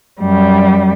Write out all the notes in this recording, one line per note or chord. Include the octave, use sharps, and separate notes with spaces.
F#2 G3